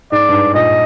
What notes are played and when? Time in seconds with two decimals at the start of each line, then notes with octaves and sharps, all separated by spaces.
0.12 G#2 D5
0.29 G2
0.33 G#2
0.54 A#2 D#5